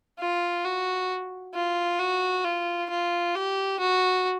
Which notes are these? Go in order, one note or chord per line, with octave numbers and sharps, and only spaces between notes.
F4
F#4
F4
F#4
F4
F4
G4
F#4